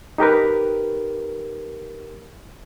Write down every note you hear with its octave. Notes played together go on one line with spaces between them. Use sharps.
D#4 G4 A#4 B4